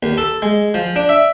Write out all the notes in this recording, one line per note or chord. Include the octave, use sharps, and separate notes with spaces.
D#2
A4
G#3
F3
D4
E5